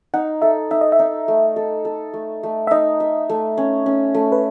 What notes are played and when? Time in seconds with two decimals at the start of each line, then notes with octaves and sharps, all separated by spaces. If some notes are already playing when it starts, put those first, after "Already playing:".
0.14 D#4 F#5
0.42 A4 E5
0.71 D#4 E5
0.81 D#5
0.92 E5
0.99 D#4
1.28 A3
1.56 A4
1.85 A4
2.14 A3
2.43 A3
2.67 E5
2.71 D#4 D#5
3.00 E5
3.29 A3
3.58 C#4
3.86 C#4
4.14 A3
4.32 B4